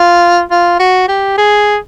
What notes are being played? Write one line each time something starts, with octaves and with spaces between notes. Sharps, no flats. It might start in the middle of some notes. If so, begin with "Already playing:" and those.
Already playing: F4
F4
F#4
G4
G#4